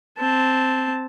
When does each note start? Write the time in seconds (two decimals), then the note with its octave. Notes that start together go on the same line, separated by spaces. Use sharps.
0.18 C4 A5